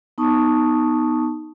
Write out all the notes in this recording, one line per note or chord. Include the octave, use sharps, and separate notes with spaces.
B3 D#4 A5 C#6 D#6